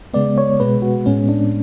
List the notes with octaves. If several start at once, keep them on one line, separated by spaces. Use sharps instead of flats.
C#3 G#3 B3 D5
C#5
B2 G#3 B3 B4
F#4
A2 G#3 B3 C#4
D4